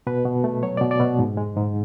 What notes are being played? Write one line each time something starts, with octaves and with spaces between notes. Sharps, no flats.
B2 B4
B2
A3
F#3 C#5
D5
B2
D5
B2
G#2
G#3
G#2